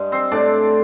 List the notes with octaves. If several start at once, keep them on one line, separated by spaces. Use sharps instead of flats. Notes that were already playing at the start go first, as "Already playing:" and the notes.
Already playing: G2 G#3
C4 C5
A2 D4 D5